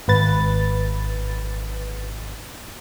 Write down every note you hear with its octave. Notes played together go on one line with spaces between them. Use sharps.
G#1 B4 A6